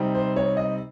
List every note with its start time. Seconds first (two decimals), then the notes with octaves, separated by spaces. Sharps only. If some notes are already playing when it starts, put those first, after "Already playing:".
Already playing: C3 G3 C4 D#4
0.15 C5
0.36 C#5
0.57 D#5